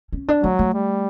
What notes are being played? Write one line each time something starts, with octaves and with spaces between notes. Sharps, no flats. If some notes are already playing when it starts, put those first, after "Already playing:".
C#4
D4
F#3 A3
A3
G3